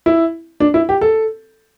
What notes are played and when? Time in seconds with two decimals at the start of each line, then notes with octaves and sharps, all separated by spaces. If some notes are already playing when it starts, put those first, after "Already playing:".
0.06 E4
0.60 D4
0.74 E4
0.89 G4
1.01 A4